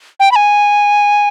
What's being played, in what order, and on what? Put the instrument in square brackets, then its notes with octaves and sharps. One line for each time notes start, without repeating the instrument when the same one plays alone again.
[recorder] G5
B5
G#5